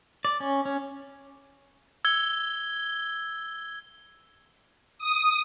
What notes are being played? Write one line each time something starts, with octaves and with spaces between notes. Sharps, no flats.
D5
C#4
C#4
E6 G#6 G7
D#6